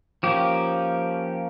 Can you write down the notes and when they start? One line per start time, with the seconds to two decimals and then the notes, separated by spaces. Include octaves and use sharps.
0.23 F3 A#3 C#4 G4